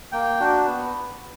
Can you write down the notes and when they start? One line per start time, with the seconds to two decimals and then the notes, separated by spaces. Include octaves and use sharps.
0.12 A#3 G5
0.40 D4 F#4
0.66 B3